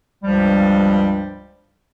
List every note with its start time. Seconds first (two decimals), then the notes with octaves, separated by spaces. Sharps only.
0.24 C#2 G2 F3 G3